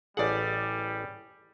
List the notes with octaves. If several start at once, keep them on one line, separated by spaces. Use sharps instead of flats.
A1 G3 G#4 D5 F#5 D6